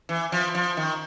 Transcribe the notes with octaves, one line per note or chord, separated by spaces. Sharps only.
E3
F3
F3
D#3